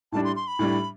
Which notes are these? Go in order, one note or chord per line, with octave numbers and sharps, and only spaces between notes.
A2 G3 D4 A5
C6
C6
B5
A2 G3 D4